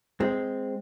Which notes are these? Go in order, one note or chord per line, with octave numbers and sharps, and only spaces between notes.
G#3 C4